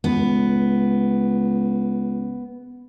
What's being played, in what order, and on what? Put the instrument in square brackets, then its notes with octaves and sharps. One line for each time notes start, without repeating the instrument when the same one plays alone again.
[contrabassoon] C#2 [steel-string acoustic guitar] B3